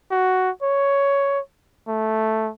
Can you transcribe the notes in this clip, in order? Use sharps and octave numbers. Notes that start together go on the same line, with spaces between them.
F#4
C#5
A3